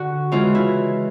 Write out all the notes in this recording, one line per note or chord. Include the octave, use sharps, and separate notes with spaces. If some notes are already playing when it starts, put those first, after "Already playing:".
Already playing: D3 F#4
C#3 E3 G#3 F4
E4